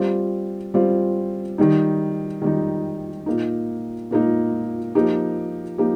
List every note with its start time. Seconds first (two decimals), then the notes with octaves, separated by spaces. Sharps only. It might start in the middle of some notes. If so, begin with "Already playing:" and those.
Already playing: G3 C4 F4
0.74 G3 C4 F4
1.58 D#3 G3 D#4
2.42 D#3 G3 D#4
3.26 A#2 A#3 D#4
4.11 A#2 A#3 D#4
4.95 F3 A#3 D#4 G4
5.78 F3 A#3 D#4 G4